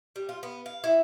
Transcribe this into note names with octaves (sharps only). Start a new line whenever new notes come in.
G3
F4
B3
F5
E4